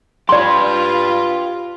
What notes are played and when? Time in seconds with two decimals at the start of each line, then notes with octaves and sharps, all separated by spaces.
0.29 F4 G4 B4 D5 C6